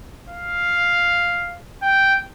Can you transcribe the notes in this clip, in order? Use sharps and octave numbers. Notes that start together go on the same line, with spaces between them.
F5
G5